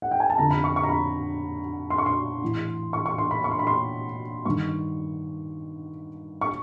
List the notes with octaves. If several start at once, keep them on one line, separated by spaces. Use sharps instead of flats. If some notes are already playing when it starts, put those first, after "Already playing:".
F#5
G5
G#5
A5
F2 D3 A#5
B5
C#6
C#6
A#5
B5
C6
C#6
C6
A2 E3
C#6
C#6
C6
B5
C#6
C6
B5
C6
G2 D#3 C#6
C#6